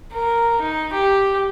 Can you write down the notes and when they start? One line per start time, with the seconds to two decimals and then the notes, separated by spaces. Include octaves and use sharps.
0.13 A#4
0.62 D#4
0.94 G4